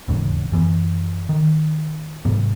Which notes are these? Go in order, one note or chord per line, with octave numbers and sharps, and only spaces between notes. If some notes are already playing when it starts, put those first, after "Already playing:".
D#1 E2 G#2 C#3
F#2 E3 B3
D#3
G#2 C3 F#3 B3